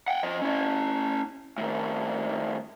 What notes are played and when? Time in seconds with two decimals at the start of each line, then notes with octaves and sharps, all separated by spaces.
0.08 F#5 G5
0.23 F3 D#5
0.42 C#4 E4
1.58 A2 D#3